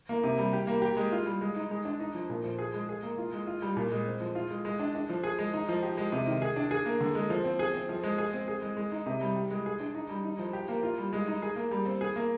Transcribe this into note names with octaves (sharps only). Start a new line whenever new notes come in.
A#3
C3
G3
G4
A#3
G4
G#3
F4
G3
G#3
D#4
G#3
D4
D#4
F3
A#2
F3
G#4
G#3
G#4
A#3
F4
G#3
F4
G3
A#2
G#3
C4
F3
F4
G#3
G#3
D4
D4
F3
G#4
G#3
D#4
F3
G4
G#3
C3
D#3
G#4
D4
G#4
A#3
D3
G#3
F3
C4
G#4
C4
F3
G#3
G#4
C4
G#4
G#3
G#3
D#4
C3
G3
G4
G#3
G#4
D4
D#4
G3
D#4
F3
G4
A#3
F4
G3
G#3
D#4
G#4
A#3
G3
C4
G#4
A#3